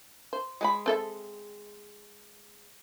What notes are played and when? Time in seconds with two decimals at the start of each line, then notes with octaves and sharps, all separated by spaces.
0.33 C5
0.61 G#3 B4 B5
0.86 C4 A4 E5